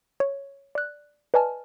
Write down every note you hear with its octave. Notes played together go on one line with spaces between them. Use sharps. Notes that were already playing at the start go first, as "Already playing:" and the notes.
C#5
D5 F#6
B4 D5 D#5 G#5 A5 F6